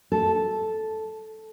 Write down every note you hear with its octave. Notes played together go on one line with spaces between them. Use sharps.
A4